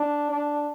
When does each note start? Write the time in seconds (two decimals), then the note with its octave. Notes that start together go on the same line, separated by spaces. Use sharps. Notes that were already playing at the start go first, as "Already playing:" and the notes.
Already playing: D4
0.30 D4